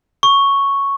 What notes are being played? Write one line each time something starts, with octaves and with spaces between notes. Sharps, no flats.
C#6